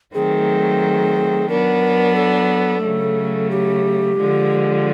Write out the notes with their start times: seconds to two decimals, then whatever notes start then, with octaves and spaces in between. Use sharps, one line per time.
0.14 D#3 F#3 A3 C4 G#4
1.49 F#3 B3 D4 A#4
2.15 A4
2.83 C#3 F#3 A3
3.50 G4
4.17 D3 F3 G#3